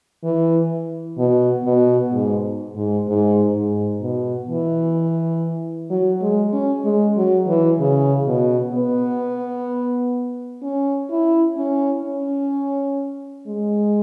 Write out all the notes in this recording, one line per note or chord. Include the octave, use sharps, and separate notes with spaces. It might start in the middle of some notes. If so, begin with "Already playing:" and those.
E3
B2
B2
G#2
G#2
G#2
G#2
B2
E3
F#3
G#3
C#4
G#3
F#3
E3
C#3
B2
B3
C#4
E4
C#4
C#4
G#3